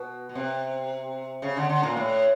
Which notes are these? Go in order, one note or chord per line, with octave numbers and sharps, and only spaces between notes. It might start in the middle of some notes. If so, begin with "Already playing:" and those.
Already playing: B2
B2
C3
C#3
D3
D3
A#2
A2